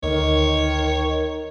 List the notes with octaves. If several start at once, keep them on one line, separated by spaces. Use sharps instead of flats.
D2 D#3 C#5